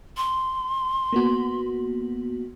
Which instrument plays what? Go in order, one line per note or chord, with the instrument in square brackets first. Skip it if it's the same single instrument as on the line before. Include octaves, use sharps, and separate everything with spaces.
[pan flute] C6
[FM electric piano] A#3 B3 F#4